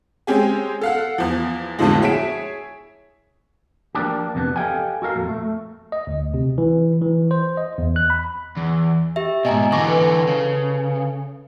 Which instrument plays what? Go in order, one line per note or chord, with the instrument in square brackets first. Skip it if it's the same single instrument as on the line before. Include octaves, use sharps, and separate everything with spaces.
[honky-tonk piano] G#3 C4 C#4 G4 G#4
A4 F5 F#5
E2 F3
B1 F2 A2 D3 F3 G#3
E4 G#4 C#5 B6 D7 E7
[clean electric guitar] F3 A#3 D4 G4
F2 C3 B3 D4
G4 A4 D#5 F5 G5 G#5
F#4 A4 A#4 F5
F2 A#2
A3
[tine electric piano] D#5
D2
C3
E3
E3
C5
D#5
E2
F#6
B5
[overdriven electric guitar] E2
[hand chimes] G4 E5
[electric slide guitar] G#2 B2 [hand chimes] D#5 G#5 A#5
[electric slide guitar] D3 E3 [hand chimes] C#6 D6 A#6
[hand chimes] A4 B4
[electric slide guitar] C#3